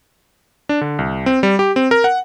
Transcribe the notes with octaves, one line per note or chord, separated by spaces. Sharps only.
D4
D3
C2
C4
G3
G4
C4
A#4
F#5